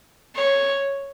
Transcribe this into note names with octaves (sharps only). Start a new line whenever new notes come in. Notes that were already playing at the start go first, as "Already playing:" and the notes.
C#5